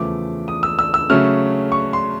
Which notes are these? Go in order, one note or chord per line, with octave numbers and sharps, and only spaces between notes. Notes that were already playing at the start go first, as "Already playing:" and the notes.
Already playing: E2 C#3 F3 A3 D6
D#6
E6
E6
E6
C#3 F#3 A3 C#4 F6
C#6
C6